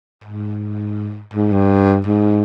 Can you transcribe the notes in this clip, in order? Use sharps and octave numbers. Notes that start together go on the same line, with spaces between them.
G#2
G#2
G2
G#2